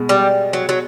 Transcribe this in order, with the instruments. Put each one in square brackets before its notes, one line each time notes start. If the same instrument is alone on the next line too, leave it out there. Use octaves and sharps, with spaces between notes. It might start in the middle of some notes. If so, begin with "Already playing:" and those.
Already playing: [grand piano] B2 G#3
[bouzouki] G3
F#3
F#3